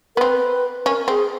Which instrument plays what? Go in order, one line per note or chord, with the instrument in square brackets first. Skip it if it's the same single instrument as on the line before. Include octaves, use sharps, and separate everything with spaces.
[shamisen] B3 [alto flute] A#4
[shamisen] C4 [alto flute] B4
[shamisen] C#4 [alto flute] A#4
[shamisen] C4 [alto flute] G#4